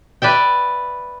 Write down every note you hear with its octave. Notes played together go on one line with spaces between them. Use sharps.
B4 D5 E5 G5